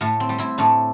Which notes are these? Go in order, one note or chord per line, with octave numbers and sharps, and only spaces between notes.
A2 A3
C4
G3
C4 E4
A2 A3 D4